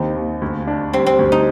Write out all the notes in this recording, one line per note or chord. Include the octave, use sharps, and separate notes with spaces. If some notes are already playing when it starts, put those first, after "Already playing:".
Already playing: D#2 D#3 C4 D#4 G4
D#2
D2
D4
G3 C4
C4
D2
D#4